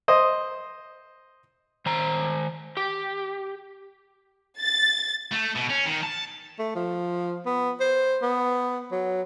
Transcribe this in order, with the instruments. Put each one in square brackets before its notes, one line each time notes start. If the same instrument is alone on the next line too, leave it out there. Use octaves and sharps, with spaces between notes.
[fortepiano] C5 D#5
[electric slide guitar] D#3 C5 A#5
G4
[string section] A6
[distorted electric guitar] A3
B2
C#4
D#3
A5
[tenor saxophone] A3
F3
B3
C5
B3
F#3